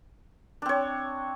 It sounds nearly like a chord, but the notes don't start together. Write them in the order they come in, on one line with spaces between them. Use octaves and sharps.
D4 C4 C#5